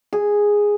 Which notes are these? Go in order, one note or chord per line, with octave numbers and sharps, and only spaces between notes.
G#4